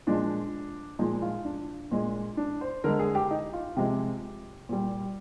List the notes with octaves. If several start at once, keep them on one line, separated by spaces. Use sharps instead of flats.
A#2 F3 G#3 D4
A#2 F3 G#3 D#4
F4
D4
A#2 G#3
D4
C5
D3 G#3 A#4
G#4
G4
D#4
F4
C3 F3 G#3 G4
A#2 G3